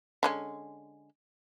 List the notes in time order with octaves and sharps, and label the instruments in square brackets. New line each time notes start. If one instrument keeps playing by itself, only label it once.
[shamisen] D3 G#3 C#4